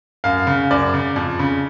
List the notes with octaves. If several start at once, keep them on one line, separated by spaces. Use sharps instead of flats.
F#2 F5
C#3
F#2 D5
C#3
F2
C#3